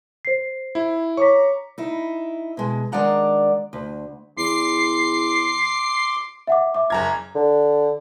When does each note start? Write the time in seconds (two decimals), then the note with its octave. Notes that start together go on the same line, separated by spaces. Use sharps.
0.25 C5 C7
0.75 E4
1.17 C#5 A#5 C#6 D6 B6
1.78 D#4 E4
2.57 B2 G#3
2.92 D#3 G#3 D4 D5 F#5 A#5
3.73 D2
4.37 E2 C6 D6 C7
6.47 E5 F#5 D6
6.75 E5 D6
6.90 F#1 A#5 G#6
7.35 D3